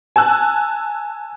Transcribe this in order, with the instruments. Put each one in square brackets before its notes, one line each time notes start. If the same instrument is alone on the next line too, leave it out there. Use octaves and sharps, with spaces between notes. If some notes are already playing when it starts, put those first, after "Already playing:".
[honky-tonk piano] G#5 A5 E6 F#6